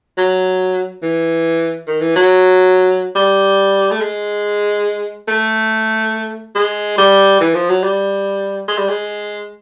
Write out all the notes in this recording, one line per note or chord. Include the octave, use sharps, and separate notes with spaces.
F#3
E3
D#3
E3
F#3
G3
A3
G#3
A3
G#3
G3
E3
F3
F#3
G3
G#3
G3
G#3